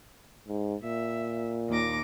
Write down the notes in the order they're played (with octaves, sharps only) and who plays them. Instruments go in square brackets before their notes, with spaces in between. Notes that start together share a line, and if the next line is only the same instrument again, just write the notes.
[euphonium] G#2
[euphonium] A#2 [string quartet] E5
[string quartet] D#2 D6 A#6